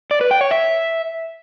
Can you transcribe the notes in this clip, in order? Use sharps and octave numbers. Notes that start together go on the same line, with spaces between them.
D5
B4
G5
C#5
E5